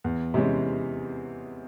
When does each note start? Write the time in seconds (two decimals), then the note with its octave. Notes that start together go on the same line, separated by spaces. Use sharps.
0.04 E2
0.34 C3 E3 G#3 C#4